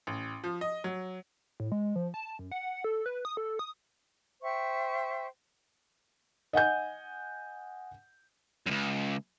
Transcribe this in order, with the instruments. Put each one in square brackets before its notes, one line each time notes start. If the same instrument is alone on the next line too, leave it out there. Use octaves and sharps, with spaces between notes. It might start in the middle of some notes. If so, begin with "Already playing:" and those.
[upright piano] A1
F3
D#5
F#3
[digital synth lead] A2
G#3
F3
A5
F#2
F#5
A4
B4
D#6
A4
D#6
[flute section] C5 E5 G5 C#6
[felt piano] D#5 F#5 G#5 G6
[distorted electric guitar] C#2 F#2